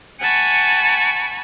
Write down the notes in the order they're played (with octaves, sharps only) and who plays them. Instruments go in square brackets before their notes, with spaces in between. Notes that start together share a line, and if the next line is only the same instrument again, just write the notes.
[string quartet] F#5 G#5 A5 B5 C#6